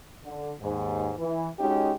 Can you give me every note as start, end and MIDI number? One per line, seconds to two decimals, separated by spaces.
0.24 0.53 50
0.60 1.12 39
0.60 1.12 44
1.18 1.48 52
1.59 1.92 56
1.59 1.92 61
1.59 1.92 63
1.59 1.92 66
1.59 1.92 67